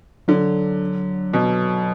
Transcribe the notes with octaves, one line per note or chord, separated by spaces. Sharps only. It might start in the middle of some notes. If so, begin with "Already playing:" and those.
D3 F#3
B2